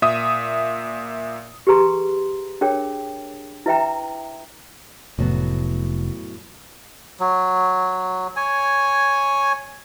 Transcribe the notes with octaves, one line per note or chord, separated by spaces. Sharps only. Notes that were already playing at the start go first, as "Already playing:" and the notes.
A#2 E5 D#6
G4 G#4 B4 A#5 C6
D4 G#4 A#4 C#5 G5
E4 B4 E5 G5 A#5
F1 A2 F#3 B3
F#3
C#5 G#5